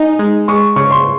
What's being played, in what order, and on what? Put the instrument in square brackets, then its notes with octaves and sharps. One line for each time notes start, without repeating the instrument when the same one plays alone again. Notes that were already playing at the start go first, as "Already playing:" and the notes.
Already playing: [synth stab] D#4 [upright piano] G#5
[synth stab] G#3
[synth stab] G#3 [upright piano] C#6
[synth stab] C#3 [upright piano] C#6
[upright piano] C6